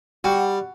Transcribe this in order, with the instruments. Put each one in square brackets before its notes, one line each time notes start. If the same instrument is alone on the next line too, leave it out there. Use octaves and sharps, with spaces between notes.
[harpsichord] G3 [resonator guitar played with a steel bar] F#4